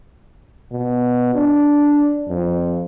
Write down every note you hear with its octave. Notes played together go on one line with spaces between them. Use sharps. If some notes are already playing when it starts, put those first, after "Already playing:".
B2
D4
F2